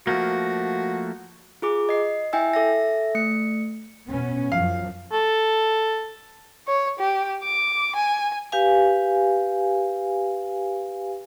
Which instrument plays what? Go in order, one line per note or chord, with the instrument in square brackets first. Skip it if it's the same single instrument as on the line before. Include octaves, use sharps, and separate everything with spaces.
[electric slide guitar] F3 A3 A#3 [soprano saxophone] F#4
[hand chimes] F4 G#4 D6
D#5 C7
E4 E5 G5 G#5 E6
A4 E5 A#6
A3 C#7
[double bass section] B2 B3 C#4
[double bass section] F#2 F3 F#3 [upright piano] F5
[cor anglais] A4
[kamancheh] C#5
G4
D6
G#5
[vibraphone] G4 B4 F5 G#5